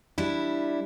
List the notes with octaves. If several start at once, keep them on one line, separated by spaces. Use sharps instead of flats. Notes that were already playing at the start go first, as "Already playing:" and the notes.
G3 D4 E4